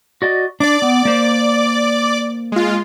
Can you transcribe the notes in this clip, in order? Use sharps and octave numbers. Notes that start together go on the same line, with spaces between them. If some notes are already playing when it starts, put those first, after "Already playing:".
F#4 D5 D#5
D4 D5 D6
B3
A#3 C5
G#3 F4